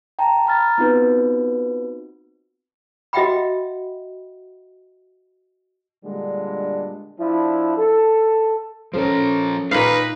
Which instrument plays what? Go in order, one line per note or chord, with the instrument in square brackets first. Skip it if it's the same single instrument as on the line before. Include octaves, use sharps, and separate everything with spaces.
[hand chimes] G5 A5 A#5
A#5 B5 F6 A6
B3 C4 D#4 F4 F#4 B4
[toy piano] F#4 D#5 E5 F#5 G5 B5
[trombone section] A#2 D3 G3 G#3 D4
F3 D4 E4
A4
[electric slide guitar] F3 A#4 [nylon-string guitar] C#4 A4 C5
[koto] A#2 F5 [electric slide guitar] D#4 [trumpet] B4